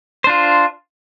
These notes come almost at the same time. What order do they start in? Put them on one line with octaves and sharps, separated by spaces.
C5 D4 F4